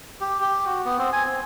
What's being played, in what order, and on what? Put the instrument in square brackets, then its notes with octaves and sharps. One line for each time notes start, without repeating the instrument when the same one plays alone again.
[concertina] G4
G4
F#4
B3
C4
G#5
C4